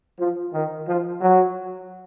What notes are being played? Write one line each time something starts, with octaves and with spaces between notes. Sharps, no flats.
F3
D#3
F3
F#3